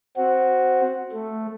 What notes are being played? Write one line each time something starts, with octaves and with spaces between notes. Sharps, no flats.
C4 F#4
A3